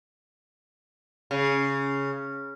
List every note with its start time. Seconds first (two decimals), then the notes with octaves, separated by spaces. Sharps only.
1.31 C#3